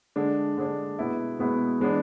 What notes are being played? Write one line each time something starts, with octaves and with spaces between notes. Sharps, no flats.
D3 G#3 D4
D3 G#3 D4
B2 G#3 B3 E4
B2 G#3 B3 E4
E3 G#3 B3 D4